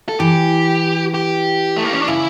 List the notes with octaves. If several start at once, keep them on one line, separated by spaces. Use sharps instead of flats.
A4
E3 G4
G4
A3
A#3
C#4
D4
C#3 E4